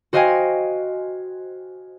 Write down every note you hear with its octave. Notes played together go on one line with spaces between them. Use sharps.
F#4 C5 D#5 F5 G5 G#5